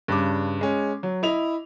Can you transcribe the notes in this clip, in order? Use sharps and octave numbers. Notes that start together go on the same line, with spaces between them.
G2 C#3 D6
G#3 C#4
F#3
E4 D#5 F7